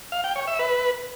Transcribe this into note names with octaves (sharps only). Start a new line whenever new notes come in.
F5
G5
C#5
E5
B4